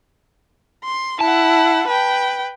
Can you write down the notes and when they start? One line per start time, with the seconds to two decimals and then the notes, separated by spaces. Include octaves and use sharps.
0.84 C6
1.20 E4 F#5 A5
1.87 B4 G5